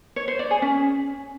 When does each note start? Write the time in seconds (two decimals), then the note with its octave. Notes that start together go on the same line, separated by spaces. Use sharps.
0.16 C#5
0.28 C5
0.39 D5
0.51 G#4
0.62 C#4